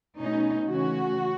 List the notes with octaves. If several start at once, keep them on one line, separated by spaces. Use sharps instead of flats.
B2 A3 C#4 D#4
C#3 E3 A3 C#4 F#4